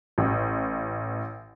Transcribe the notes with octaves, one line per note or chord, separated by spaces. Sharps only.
A1